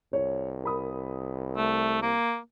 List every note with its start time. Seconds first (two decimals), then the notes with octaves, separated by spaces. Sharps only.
0.13 C2 C#5
0.64 A#4 B5 D#6
1.57 A3
2.02 A#3